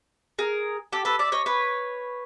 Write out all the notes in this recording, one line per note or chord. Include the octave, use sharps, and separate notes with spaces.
G#4 A#4
G4 A4
A4 B4
D5 E5
C#5 D#5
B4 C#5